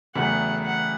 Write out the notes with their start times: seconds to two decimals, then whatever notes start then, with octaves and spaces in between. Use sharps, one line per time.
0.15 E1 E2 C#3 F#3 A3 F#5
0.65 F#5